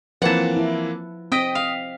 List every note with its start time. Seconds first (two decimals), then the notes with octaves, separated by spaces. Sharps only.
0.22 E3 F3 A#3 C4 B4 F#5 A5
0.57 E4
1.32 C4 D#5 G5 D#6 B6
1.55 F5